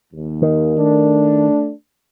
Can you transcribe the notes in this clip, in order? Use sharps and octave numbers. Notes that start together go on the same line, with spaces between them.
D#2
D#3
A3 D4